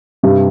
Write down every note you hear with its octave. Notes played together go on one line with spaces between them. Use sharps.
G2 C3